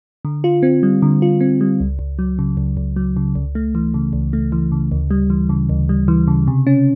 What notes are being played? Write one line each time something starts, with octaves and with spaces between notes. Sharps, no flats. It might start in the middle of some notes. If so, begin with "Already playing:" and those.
D3
F4
C4
G3
D3
F4
C4
G3
C#2
C#2
F#3
C#3
C#2
C#2
F#3
C#3
C#2
A3
E3
C#3
C#2
A3
E3
C#3
D2
G3
E3
C#3
D2
G3
E3
C#3
C3
C#4